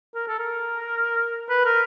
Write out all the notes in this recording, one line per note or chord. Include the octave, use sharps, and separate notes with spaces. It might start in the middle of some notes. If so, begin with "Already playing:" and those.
A#4
A4
A#4
B4
A#4